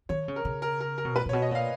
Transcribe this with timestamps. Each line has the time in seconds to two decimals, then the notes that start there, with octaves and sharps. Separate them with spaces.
0.09 D#3 C#5
0.28 C#3
0.36 A#4
0.45 C#3
0.62 A#4
0.80 A#4
0.98 A#4
1.05 B2
1.16 A#2 B4
1.26 A#2
1.29 C#5
1.33 B2
1.42 D#5
1.51 A#2 F5